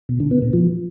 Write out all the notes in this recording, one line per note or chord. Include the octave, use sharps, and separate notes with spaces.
B2
D3
B3
A#2
F3